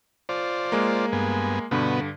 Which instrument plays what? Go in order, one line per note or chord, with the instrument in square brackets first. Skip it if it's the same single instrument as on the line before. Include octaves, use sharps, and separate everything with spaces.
[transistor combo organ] F4 C5 D5
[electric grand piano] G#3 A#3
[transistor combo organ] G2 B3 G#5
[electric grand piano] G2 D3 [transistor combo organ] B2 B3 F#4